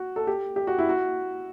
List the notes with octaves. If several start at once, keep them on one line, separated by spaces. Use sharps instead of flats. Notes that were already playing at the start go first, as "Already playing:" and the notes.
Already playing: F#4
A4
G4
G4
F#4
E4
F#4